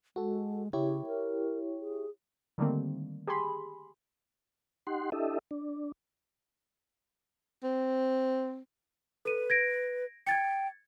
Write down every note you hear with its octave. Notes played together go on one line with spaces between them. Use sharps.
G#3 F#4 A4
C#3 E4 G4 C#5
A#4
G#4
D3 D#3 G3 A3 A#3 C4
G4 G#4 G#5 B5 C6
D#4 G4 F#5 C6
D4 E4 G4 A4 D#5 E5
D4
C4
A4 B4 D#7
G#6 A#6 D7
G5 G#6 A6 C#7